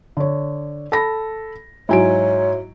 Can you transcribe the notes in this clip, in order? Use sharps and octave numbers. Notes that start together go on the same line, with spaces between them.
D3 C#5
A4 B5 A#6
G#2 F#3 E4 C#5 G#5 D7